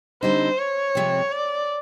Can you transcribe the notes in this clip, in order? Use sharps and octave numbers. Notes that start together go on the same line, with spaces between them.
D3 G3 C4 D#4 C5
C#5
C3 F3 G#3 C4
D5